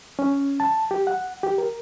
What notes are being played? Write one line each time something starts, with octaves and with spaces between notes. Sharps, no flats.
C#4
A5
G4
F#5
G4
A#4